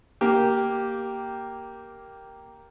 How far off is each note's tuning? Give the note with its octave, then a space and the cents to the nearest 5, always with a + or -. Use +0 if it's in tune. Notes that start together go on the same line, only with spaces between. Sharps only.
A#3 +0 G4 -5